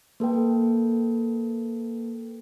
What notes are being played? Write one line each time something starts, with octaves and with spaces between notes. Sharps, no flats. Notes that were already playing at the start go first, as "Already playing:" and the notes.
A#3 A4 B4 G5